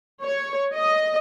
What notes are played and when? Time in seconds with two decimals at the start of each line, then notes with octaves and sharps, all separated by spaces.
0.24 C#5
0.75 D#5